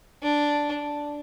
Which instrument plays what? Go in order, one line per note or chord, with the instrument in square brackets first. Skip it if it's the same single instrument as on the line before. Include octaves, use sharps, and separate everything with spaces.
[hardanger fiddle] D4